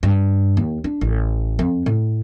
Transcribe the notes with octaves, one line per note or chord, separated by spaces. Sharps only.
G2
D#2
D4
A1
F2
A2